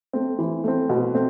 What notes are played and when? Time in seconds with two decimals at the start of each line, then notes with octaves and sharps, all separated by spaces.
0.13 A3 C4
0.39 E3
0.64 A3 C4
0.89 B2
1.15 A3 C4